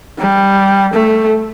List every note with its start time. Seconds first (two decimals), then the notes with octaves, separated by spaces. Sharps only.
0.19 G3
0.93 A3